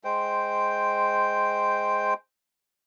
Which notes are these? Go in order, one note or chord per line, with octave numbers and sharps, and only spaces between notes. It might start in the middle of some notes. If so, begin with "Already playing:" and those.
G#3 C5 G5